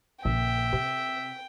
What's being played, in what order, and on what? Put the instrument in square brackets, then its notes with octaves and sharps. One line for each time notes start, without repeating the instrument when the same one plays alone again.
[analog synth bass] A#1 [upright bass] A#2 C#3 [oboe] E5 [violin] G5
[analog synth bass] C3 [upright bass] C4